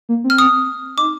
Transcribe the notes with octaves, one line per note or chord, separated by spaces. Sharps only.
A#3
C4
F6
D#6
D#4 D6